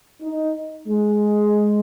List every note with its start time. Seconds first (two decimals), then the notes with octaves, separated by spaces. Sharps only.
0.22 D#4
0.88 G#3